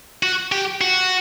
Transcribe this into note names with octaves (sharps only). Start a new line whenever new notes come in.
F#4
G4
F#4